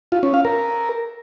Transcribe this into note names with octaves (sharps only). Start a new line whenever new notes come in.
F4
C#4
F5
A#4